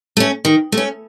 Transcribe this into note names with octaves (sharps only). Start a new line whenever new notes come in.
A3 C#4
D#3
A3
C#4